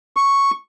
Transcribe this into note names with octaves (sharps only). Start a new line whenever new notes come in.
C#6